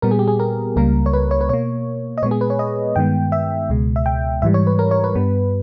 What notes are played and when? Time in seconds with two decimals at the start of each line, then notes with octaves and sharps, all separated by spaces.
0.02 A#2 G3 B3 A#4
0.11 G#4
0.19 G4
0.28 G#4
0.40 A#4
0.76 C#2 C#3 G3 A#3 A#4
1.06 C#5
1.13 B4
1.31 C#5
1.41 B4
1.49 B2 A#3 C#5
2.18 D#5
2.22 A#2 G#3 B3 C#5
2.31 G#4
2.41 B4
2.50 C#5
2.59 D#5
2.96 G2 D#3 G#3 B3 G5
3.32 E5
3.69 C#2 B2 G#3
3.96 E5
4.06 G5
4.42 G#2 E3 G3 E5
4.54 C#5
4.67 B4
4.79 A#4
4.91 C#5
5.04 B4
5.15 G2 G3 B3